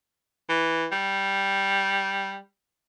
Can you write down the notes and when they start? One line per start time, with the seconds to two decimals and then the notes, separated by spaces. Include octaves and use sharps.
0.49 E3
0.92 G3